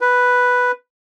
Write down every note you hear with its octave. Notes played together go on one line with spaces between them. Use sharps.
B4